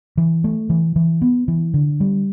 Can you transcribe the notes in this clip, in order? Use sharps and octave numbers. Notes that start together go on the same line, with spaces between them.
E3
A3
E3
E3
B3
E3
D3
G3